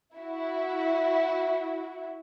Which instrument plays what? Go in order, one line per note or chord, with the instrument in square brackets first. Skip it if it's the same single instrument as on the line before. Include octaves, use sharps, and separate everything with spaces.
[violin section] E4 F#4